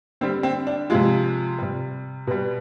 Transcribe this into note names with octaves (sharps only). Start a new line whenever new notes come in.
D3 G3 C4
C4
D4
C3 F3 G#3 F4
C3 G3
B2 G3